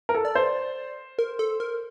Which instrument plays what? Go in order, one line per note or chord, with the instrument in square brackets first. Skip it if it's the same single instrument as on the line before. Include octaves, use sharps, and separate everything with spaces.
[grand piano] A#4
A4
[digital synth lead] D5
[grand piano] C5
[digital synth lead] A#4
A4
A#4